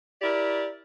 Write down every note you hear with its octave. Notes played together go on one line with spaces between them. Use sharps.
E4 G4 A#4 D5